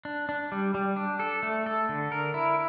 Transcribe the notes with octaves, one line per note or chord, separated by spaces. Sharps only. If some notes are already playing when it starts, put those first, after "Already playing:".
D4
D4
G3
G3
D4
A4
A3
A4
D3
A#4
E4